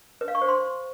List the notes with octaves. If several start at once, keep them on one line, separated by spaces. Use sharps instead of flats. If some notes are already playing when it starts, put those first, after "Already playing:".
B4
F5
C#6
C5
C6